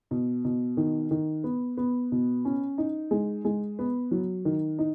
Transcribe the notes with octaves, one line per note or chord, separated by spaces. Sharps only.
B2
B2
D#3
D#3
B3
B3
B2
C#4
D#4
G#3
G#3
B3
F#3
D#3
D#4